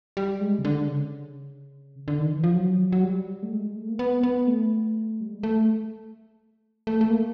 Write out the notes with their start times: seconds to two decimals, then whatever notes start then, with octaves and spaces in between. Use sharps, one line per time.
0.17 G3
0.41 G#3
0.59 C#3
0.65 D3
0.88 C#3
2.08 D3
2.20 D#3
2.32 E3
2.44 F3
2.55 F#3
2.92 F#3
3.03 G3
3.42 A3
3.51 G#3
3.76 A3
3.88 A#3
3.99 B3
4.23 B3
4.47 A3
5.21 G3
5.32 G#3
5.43 A3
6.87 A3
7.01 A3
7.10 A#3